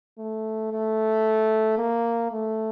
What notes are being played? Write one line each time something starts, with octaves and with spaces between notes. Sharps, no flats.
A3
A3
A#3
A3